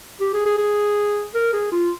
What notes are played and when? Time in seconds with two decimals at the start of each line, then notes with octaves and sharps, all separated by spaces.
0.21 G4
0.33 G#4
0.46 G#4
0.58 G#4
1.35 A#4
1.53 G#4
1.72 F4